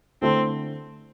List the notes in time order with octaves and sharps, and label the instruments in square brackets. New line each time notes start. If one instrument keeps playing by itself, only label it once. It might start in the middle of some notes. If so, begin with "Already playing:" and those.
[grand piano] D3 A3 E4 A4 [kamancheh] C4